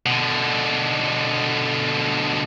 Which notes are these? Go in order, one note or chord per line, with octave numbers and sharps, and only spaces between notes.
B2 D3